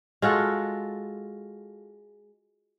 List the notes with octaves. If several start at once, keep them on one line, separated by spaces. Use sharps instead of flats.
G#3 F4 F#4 A4